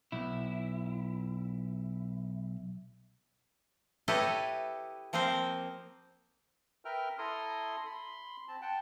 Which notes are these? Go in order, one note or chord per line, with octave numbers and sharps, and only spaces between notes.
B1 E4
E4 G4 A4 B4 C#5 D#5
F3 A#3 C4 A#4 C5
A#4 B4 E5 G5 F6
E4 A4 A#5 C6 D#6
B5 C6
C4 A5
F#5 G5 A5